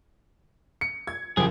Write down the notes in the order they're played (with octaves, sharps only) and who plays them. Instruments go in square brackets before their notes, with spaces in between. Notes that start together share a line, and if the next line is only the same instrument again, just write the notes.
[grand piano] C#7
[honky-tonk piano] G#6
[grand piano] F#1 [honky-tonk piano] F3 [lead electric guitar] G4 G#4